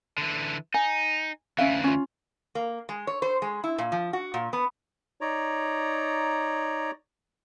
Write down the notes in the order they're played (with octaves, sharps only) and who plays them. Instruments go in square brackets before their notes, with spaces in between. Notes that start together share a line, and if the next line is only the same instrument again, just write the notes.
[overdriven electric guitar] D3 E3
[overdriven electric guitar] D#4 [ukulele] G#5
[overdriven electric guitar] D2 E3 [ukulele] C#4 E5 F5
[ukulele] C#4 F4
[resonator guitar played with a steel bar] A#3
G#3
C#5
C5
G#3
E4
A#2
F3
F#4
A#2
B3
[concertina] D#4 C#5 D5 A#5